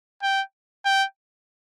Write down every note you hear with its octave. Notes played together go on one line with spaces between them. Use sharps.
G5
G5